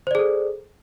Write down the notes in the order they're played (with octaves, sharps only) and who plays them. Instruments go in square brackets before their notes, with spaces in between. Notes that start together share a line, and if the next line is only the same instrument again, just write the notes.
[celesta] C5
D5
G#4
A4